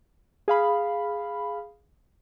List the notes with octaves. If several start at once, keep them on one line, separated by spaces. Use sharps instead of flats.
G#4 F5 B5